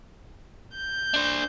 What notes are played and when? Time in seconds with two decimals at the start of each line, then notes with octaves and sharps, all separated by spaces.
0.75 G6
1.14 D4 C5